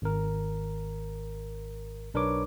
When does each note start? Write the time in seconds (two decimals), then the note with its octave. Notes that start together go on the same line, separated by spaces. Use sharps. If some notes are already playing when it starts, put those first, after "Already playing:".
0.02 G#1 A#4
2.14 B1 D4 A#4 B4 C#5 D6